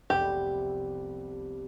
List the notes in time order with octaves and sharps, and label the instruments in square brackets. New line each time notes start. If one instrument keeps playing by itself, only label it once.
[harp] F1 C2 B3 [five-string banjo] G4